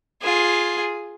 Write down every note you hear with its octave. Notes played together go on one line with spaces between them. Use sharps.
F4 G#4